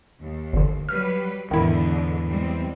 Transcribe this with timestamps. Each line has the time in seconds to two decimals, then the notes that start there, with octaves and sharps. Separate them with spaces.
0.19 D#2
0.53 G1 D3
0.89 F#3 G3 B4 F6
1.51 E2 G#2 D3 D#3 G#3 E4
2.27 G3 G#3 C4